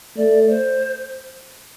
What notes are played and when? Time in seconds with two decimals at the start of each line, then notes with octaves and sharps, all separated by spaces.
0.17 A3 D5
0.49 C5